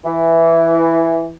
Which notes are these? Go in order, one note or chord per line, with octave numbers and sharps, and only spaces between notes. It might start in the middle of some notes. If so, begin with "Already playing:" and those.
E3